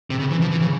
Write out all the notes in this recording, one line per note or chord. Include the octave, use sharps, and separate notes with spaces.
C3
C#3
E3
F3
E3
C#3